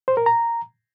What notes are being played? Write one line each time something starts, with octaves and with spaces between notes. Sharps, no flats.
C5
A#4
A#5